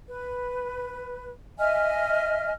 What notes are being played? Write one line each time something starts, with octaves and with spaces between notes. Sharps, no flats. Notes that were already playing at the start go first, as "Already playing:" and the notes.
B4
D#5 E5 G#5 F6